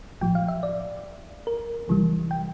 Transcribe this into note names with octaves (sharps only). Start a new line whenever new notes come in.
A#1 A2 F3 G5
F5
E5
D5
A#4
C2 C3 E3 G3
G5